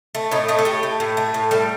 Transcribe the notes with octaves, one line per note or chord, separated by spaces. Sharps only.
A3
A2 D#4
A3 D#4
A4
A2 G4
A3
A2
A3
A2
G3 A4